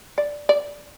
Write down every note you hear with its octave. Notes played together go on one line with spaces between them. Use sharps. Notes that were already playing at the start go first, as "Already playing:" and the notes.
D5
D5